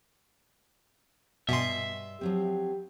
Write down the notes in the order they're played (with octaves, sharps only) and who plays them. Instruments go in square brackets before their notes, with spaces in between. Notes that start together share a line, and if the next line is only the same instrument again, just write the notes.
[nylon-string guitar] G2 D#5 G#5 [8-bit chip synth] B2 C6 [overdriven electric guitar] E5
[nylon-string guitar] F3 F#3 C4 [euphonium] G4